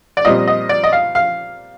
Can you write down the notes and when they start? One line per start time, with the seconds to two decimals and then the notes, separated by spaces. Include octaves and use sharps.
0.17 D5
0.25 A#2 G3 C4 D#5
0.47 D#5
0.69 D5
0.84 D#5
0.92 F5
1.15 F5